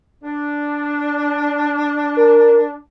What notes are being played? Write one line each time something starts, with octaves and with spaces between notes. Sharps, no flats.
D4
A#4